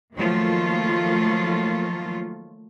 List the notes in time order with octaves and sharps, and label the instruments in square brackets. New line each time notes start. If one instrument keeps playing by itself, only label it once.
[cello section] D#3 F3 F#3 A3 A#3 F4